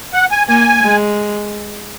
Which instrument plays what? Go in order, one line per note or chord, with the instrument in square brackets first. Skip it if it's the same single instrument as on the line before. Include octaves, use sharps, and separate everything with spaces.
[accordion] F#5
G#5
[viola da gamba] A#3 [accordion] G#5
[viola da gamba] G#3